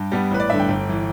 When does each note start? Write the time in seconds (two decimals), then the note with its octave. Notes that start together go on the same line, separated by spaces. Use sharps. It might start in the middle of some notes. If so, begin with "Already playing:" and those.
Already playing: G2 G5
0.12 G3 B3 D4
0.31 A1 B4
0.40 D5
0.50 G2 D3 E5
0.60 G5
0.68 G1
0.89 E3